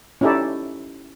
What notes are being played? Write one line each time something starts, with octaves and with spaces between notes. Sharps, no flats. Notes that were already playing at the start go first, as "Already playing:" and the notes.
C#4 D#4 E4 G4 A4 D5